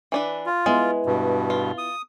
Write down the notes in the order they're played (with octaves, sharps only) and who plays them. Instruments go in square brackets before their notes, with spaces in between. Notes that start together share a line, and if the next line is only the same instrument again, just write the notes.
[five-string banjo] E3 D4 B4
[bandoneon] F4
[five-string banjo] G#3 [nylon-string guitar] B3 E4
[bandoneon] G2 B2
[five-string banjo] F4
[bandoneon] D#6